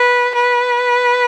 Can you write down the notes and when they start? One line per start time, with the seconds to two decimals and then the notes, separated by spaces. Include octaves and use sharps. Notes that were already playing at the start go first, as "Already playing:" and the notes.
Already playing: B4
0.35 B4